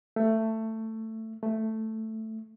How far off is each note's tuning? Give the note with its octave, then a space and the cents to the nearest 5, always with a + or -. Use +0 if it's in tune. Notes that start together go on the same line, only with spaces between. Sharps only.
A3 +15
A3 +5